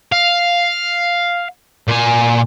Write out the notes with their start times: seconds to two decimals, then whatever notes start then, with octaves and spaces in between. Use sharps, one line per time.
0.12 F5
1.88 A#2 G#5